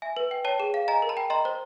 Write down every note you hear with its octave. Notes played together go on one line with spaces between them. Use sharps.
E5 G#5
B4
G5
C#5 G5 A5
G#4
F5
D#5 G#5 A#5
A#4
A5 B5
G5
D#5 A#5 C6
C5